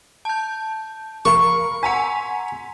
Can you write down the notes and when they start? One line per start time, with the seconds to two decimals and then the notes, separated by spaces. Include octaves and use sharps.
0.25 A5 G6
1.25 A#4 F5 B5 C#6
1.83 F#5 G#5 A#5 C6 B6 C#7